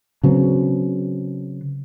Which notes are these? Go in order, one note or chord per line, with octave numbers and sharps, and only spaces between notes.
C#3 F#3 B3 C4